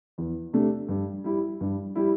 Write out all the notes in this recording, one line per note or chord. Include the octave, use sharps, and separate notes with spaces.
E2
C3 A3 D4
G2
G3 E4
G2
G3 E4